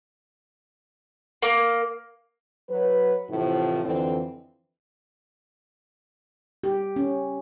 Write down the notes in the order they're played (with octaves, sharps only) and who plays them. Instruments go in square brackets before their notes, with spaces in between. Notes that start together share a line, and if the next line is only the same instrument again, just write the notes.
[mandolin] A#3
[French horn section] F#3 B4
A2 C3 E3 F3
F2 D3 E3 C4
[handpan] G4
C#4